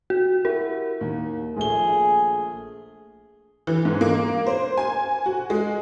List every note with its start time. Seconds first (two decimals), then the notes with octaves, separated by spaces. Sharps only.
0.10 F#4
0.45 E4 F#4 G4 A#4
1.01 D#2
1.56 A#1 A3 G#4 G7
3.67 E3
3.85 G#2
4.01 A#3
4.47 C5
4.77 G#5
5.26 F#4
5.50 G#3